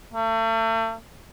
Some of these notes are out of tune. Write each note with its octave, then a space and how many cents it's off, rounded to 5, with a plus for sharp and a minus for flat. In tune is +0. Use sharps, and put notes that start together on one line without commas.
A3 +40